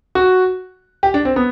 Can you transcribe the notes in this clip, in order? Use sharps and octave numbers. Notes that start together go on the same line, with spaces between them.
F#4
G4
D4
C4
B3